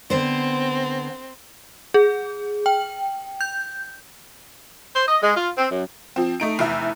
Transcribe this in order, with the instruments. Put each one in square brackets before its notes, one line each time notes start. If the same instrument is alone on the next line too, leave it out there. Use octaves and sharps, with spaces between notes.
[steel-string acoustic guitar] D3 B3 C5 [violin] C4
[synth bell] G#4
G5
G6
[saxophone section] C5
D#5
G#3
F4
C4
F#2
[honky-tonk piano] F3 C4
A3 D#4 D7
F1 E2 E5